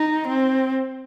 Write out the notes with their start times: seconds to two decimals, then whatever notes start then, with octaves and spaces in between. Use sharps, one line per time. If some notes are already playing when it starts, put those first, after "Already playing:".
Already playing: D#4
0.28 C4